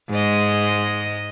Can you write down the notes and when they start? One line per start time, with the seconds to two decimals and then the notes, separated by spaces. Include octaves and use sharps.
0.10 G#2 G#3 D#5